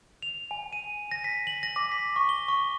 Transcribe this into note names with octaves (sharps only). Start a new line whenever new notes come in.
F7
G#5
D#7
A#6
B6
F#7
A#6
D6
B6
C#6
G7
C#6